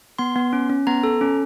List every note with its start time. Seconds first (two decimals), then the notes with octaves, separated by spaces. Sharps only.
0.19 B3 C6
0.36 B3
0.53 C#4
0.70 C#4
0.87 B3 A#5
1.03 A4
1.21 C#4